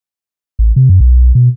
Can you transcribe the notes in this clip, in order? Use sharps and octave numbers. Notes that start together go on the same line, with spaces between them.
A1
C3
F#2
B1
B2